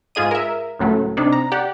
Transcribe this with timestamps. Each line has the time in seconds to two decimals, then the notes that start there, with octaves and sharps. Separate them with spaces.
0.15 G#2 F4 G#4 D#5 D#7
0.31 A#4 E5
0.79 C#2 A2 F#3 A3
1.17 C3 D4 D#4
1.32 A#5
1.52 G4 D5 F#5